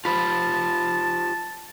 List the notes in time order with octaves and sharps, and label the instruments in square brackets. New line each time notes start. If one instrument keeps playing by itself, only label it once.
[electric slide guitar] F4 G4 C5 [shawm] A5 [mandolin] B5